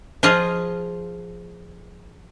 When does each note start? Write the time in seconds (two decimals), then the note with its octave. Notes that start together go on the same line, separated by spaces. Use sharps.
0.23 F3 F4 G#4 D#5